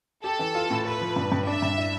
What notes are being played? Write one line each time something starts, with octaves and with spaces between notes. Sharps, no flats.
G4 A4
E3
F4
A2
A4 B4
F3
G2
G2
D4 E5
G2
E4